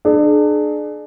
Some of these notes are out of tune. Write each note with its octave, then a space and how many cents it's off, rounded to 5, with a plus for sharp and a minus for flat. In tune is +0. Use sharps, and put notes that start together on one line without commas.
D4 +35 G#4 +35